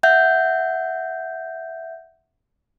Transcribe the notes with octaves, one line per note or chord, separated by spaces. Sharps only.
E5 F#5 G6